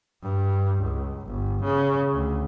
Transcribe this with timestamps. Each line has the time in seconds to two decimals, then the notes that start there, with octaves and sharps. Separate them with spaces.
0.23 G2
0.82 C#2
1.26 G1
1.64 C#3
2.14 D2